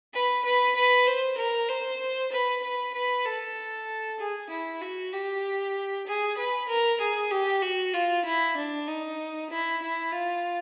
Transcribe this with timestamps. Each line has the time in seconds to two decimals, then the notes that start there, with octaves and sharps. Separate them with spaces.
0.14 B4
0.45 B4
0.76 B4
1.07 C5
1.38 A#4
1.69 C5
2.32 B4
2.64 B4
2.94 B4
3.26 A4
4.19 G#4
4.50 E4
4.82 F#4
5.13 G4
6.07 G#4
6.38 B4
6.69 A#4
7.01 G#4
7.31 G4
7.63 F#4
7.94 F4
8.25 E4
8.57 D4
8.88 D#4
9.50 E4
9.82 E4
10.12 F4